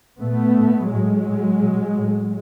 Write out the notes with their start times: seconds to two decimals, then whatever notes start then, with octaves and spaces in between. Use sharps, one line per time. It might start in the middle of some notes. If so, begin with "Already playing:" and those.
0.20 A#2 A3 B3
0.55 A2
0.91 A2 F#3 G#3
1.26 A2
1.61 A#2
1.96 A2